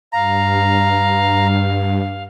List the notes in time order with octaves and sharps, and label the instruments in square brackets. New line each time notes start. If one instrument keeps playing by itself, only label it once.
[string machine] G2 [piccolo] F5 [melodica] A#5